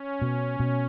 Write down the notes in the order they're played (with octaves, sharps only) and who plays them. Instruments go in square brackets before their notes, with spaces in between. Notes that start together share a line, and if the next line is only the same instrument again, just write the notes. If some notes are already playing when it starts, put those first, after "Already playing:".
Already playing: [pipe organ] C#4
[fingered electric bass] B2
B2